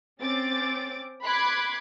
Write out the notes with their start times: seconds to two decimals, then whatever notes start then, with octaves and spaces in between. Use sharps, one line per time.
0.21 C4 C#4 D6 A6
1.23 B5 C6 D6 F#6 G#6 B6